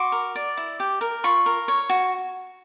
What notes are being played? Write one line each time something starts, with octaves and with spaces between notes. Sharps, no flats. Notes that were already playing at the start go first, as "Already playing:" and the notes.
Already playing: F#4 C6 D6
A#4
D5
E4
G4
A#4
F4 B5 C#6
A#4
C#5
F#4